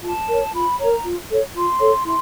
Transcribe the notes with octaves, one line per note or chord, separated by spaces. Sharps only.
F4 A5
A#4 C#5
F4 B5
A#4 C#5 A#5
F4
A4 C#5
F4 C6
A4 C#5
E4 C6